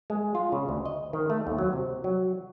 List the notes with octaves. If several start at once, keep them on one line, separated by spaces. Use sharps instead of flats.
G#3
F4
C#3
D2
D#5
D#3
A3
D#2
F#3
C3
F#3